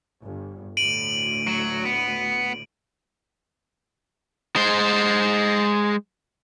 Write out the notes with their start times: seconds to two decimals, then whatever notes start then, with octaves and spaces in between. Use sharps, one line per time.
0.23 G1
0.77 D2 A2 D7 D#7 F#7
1.47 F#3
1.85 B3
4.56 G#3 C5